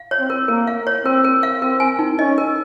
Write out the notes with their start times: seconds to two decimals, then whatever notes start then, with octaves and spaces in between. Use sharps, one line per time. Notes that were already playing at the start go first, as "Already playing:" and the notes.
Already playing: F5
0.11 C#5
0.20 C4
0.30 A#4
0.48 A#3 A#4
0.67 F5
0.87 C#5
1.04 C4 A#4
1.25 A#4
1.43 F5
1.62 C4 A#4
1.80 G#5
1.99 D#4
2.19 C#4 D#5
2.38 A#4